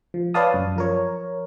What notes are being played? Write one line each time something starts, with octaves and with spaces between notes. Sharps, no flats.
F3
B4 C#5 D5 F5 A5 D#6
F#2
F3 A#4 C#5